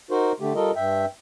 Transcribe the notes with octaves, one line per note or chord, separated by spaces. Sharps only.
D#4 F#4 A#4 C5
D3 A3 G4
G3 F4 A4 A#4 D#5
G2 E5 G5